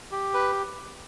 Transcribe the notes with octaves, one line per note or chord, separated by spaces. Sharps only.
G4
B4